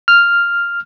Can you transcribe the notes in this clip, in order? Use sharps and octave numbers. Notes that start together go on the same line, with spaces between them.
F6